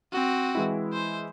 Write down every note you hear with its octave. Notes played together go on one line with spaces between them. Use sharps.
C4 F#4
E3 G#3 E4
C5